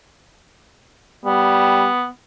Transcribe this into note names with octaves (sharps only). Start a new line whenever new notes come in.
G3 B3